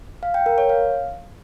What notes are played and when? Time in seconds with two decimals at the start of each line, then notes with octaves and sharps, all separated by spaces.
0.23 F5
0.34 G5
0.46 A#4
0.58 C#5
0.70 F5